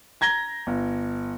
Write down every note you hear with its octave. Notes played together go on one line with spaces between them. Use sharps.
A#5 G#6 A#6 G7
G1